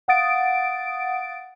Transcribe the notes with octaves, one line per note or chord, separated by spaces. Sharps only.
F5 F#5 D#6 A6 D7